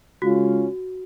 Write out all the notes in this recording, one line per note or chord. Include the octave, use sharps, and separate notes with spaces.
C#3 G#3 C#4 F4 F#4